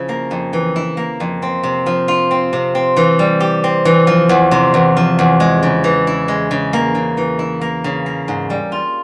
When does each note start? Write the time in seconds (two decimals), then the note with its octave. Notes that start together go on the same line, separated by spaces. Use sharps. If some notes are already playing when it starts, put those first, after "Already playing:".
Already playing: C#3 F3 E4
0.09 A#3
0.31 F2
0.53 E3
0.76 E4
0.97 A#3
1.20 F2
1.42 C4
1.63 C3
1.86 F3
2.08 F4
2.31 C4
2.53 C3
2.75 C4
2.97 E3
3.19 G3
3.40 G4
3.64 C4
3.85 E3
4.07 F3
4.29 E2
4.51 C3
4.74 E2
4.97 F3
5.19 E2
5.40 G#3
5.63 C#3
5.84 E3
6.07 E4
6.28 G#3
6.51 C#3
6.73 A#3
6.95 C#3
7.17 E3
7.39 E4
7.61 A#3
7.84 C#3
8.06 A#3
8.28 G#2
8.50 G3
8.72 F4